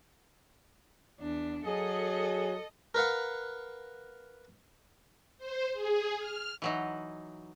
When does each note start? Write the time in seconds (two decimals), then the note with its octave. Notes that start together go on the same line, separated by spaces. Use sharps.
1.18 E2 D4
1.66 F#3 G#4 A4 D#5
2.95 A#4 B4 F5 F#5
5.38 C5
5.73 G#4
6.18 F6
6.62 E3 F#3 D#4